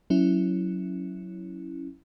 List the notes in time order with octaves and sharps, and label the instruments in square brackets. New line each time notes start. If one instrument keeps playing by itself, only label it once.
[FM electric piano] F#3 C#4 E4